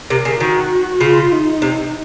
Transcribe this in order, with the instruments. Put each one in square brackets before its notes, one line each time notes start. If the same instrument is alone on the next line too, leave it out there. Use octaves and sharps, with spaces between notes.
[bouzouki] C3 [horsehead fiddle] A#4
[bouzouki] C#3
[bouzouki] D#3 [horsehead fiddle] F#4
[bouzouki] C#3 [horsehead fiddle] F4
[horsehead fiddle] D#4
[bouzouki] C3